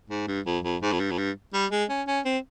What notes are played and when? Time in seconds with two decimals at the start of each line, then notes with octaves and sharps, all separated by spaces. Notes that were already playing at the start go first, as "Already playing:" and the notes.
0.10 G#2
0.27 G2
0.46 F2
0.64 F2
0.82 G#2
0.92 F2
1.00 G2
1.11 F2
1.18 G2
1.54 G3
1.72 G#3
1.90 C#4
2.07 C#4
2.25 C4